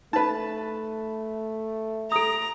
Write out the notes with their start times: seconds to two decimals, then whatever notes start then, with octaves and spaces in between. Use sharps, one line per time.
0.13 A3 D#4 B4 A5
2.12 A4 A#5 D#6